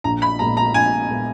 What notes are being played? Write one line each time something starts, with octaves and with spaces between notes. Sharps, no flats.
A#1 A#5
B5
A#2 G#3 B3 A#5
A#5
A#1 G#5
A#2 G#3 B3